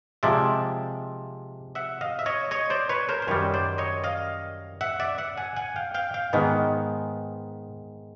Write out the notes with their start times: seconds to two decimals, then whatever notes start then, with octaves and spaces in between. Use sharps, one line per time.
0.23 C3 F3 G#3 D5 E5
1.75 E5 F#5
2.01 D#5 F5
2.19 E5
2.26 C#5 D#5
2.51 C#5 D#5
2.70 C5 D5
2.89 B4 C#5
3.09 A#4 C5
3.22 C5
3.27 F#2 D#3 G3 B4 C#5
3.54 C5 D5
3.78 C#5 D#5
4.04 D#5 F5
4.81 E5 F#5
5.00 D5 E5
5.18 E5 F#5
5.38 F#5 G#5
5.56 F#5 G#5
5.76 F5 G5
5.94 F5 G5
6.14 F5 G5
6.33 G#2 D#3 G#3 B3